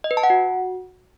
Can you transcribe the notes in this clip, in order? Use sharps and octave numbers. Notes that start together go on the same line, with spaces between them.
D#5
B4
A5
F#5
F#4